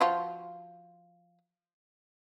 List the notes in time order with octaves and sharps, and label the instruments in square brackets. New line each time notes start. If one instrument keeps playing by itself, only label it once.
[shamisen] F3 F4 F#4